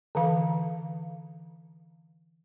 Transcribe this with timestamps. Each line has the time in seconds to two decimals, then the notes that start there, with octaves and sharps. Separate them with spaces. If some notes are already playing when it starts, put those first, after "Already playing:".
0.15 D3 E3 F5